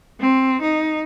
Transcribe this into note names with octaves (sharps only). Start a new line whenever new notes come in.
C4
D#4